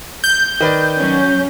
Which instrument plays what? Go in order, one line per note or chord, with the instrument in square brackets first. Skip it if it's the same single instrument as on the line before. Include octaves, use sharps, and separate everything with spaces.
[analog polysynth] G6
[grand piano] D#3 B4 D5
[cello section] F#3 C#4